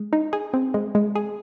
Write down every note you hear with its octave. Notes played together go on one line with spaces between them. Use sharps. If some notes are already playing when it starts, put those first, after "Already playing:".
Already playing: G#3
D#4
G#4
C4
G#3
G#3
G#4